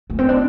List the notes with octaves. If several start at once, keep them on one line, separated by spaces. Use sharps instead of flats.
A3
C4
D4